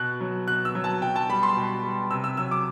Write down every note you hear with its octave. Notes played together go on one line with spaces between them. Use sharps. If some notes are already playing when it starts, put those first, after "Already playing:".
Already playing: B2 F#6
F#3
B2 F#6
E6
F#3
A5
B2 G5
A5
G3 B5
C6
B2
G3
C3 E6
E6
F#3 E6
D6